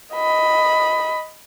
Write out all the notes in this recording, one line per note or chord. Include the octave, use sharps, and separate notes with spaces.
D#5 B5